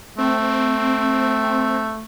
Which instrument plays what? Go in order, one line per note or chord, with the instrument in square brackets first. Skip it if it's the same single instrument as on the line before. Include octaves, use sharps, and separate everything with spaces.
[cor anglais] A3 [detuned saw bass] C4